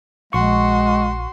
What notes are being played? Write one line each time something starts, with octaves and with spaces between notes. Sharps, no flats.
A#1 G#3 F#4 C6 C#6